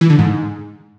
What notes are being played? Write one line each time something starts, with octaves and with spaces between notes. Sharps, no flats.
E3
D3
G#2